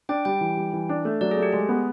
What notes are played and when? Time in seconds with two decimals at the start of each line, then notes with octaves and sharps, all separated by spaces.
0.09 D4 G5
0.25 G3 G5
0.41 E3
0.57 G3
0.73 E3
0.89 D4
1.05 A3
1.21 F#3 D5
1.31 G#4
1.37 A3
1.43 G4
1.52 G#3 G#4
1.69 B3